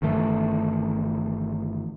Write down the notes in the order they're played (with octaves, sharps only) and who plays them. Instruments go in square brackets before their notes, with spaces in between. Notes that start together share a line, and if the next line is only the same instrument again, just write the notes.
[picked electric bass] G1 D#3 E3 A3